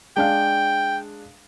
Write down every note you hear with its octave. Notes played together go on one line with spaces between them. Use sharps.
G#3 D4 F5 G5